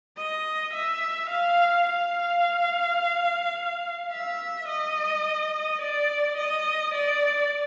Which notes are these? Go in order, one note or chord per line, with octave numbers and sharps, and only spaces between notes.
D#5
E5
F5
F5
E5
D#5
D5
D#5
D5